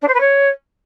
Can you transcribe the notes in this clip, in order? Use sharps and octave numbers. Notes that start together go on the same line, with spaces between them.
D4
C5
B4
C#5